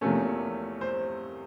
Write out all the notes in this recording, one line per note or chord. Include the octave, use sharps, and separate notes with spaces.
E2 C3 F3 A3 A#3 C#4 A4
C5